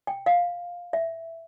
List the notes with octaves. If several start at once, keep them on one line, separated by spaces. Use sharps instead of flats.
G5
F5
E5